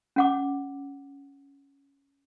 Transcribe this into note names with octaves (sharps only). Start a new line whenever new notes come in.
C#4 F#5 D6